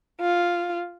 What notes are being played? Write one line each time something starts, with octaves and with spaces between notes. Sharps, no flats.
F4